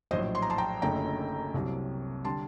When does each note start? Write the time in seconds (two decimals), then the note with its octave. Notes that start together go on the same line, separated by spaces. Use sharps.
0.11 A#1 A2 F#3 C5 D#5
0.35 C6
0.42 A#5
0.50 A5 C6
0.58 G5 A#5
0.82 F#1 F#2 D3 A3 D#4 G5 A#5
1.54 C2 C3 F#3
2.25 D3 G3 A5 C6